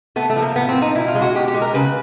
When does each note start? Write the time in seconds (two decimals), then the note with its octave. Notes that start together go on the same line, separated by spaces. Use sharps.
0.16 A3 B3
0.30 A3
0.36 F3
0.42 A#3
0.56 A2 B3
0.69 C4
0.76 F3
0.82 D#4
0.95 B2 E4
1.08 F4
1.15 G#3
1.22 F#4
1.35 B2 G4
1.48 G4
1.54 G#3
1.61 A#4
1.74 C#3 B4